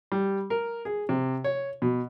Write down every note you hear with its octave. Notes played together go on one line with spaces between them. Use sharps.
G3
A#4
G#4
C3
C#5
B2